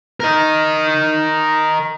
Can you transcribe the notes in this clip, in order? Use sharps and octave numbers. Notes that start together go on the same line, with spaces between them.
A#4 D#5